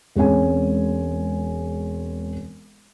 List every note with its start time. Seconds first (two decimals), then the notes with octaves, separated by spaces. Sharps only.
0.15 E1 G#3 C4 C#4 G#4 G#5